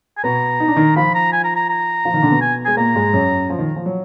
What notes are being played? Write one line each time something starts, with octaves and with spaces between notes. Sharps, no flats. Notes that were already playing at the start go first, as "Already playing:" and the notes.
G#5
B2 B3 A#5
D#4
D4
D#3 D#4
F3 F4 B5
A#5
G#5
A#5
A#5
A#5
F3 F4
D#3 D#4
D3 D4
B2 B3
G#5
G#3 G#5
A#2 A#3 A#5
G#2 G#3
F#2 F#3
F3
D#3
F3
F#3